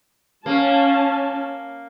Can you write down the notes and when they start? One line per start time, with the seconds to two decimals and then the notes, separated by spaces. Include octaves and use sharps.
0.46 A#3 C#4 A5